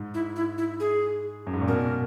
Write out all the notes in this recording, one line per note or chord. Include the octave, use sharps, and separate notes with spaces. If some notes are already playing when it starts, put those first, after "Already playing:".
Already playing: G#2
E4
E4
E4
G#4
F#2
G#2
A#2
B2 A#4